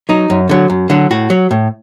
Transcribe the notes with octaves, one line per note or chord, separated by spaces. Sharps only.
F#3 D#4
F#2
D3 F#3
F#2
D3 F#3
A2 F#4
F#3
A2